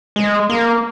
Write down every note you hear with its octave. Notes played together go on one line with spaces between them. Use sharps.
G#3
A#3